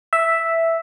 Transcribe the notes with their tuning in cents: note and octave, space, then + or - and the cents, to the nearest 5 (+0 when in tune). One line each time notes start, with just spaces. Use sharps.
E5 +0